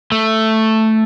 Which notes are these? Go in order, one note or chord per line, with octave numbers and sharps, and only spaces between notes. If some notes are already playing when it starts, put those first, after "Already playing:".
A3